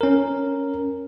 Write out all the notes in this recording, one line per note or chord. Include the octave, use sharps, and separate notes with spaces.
C#4 A#4